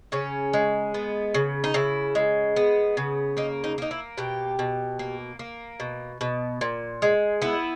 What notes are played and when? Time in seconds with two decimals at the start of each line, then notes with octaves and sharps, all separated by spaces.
0.12 C#3 C#4
0.53 G#3
0.94 B3
1.34 C#3
1.64 D#4
1.74 C#3 E4
2.15 G#3
2.56 B3
2.97 C#3
3.37 A#3 D#4
3.64 D#4
3.78 A#3 D#4
3.91 E4
4.18 B2 G4
4.59 B2
4.99 A#3
5.39 A#3
5.80 B2
6.21 B2
6.61 A#2
7.02 G#3
7.42 B3 E4